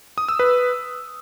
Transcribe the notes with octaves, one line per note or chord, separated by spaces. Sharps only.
D#6
E6
B4